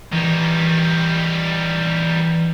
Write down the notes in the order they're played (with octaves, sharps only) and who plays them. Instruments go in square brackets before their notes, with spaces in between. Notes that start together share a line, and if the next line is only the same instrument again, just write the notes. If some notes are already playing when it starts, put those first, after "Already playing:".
[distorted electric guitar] D#3 G3 [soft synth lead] E3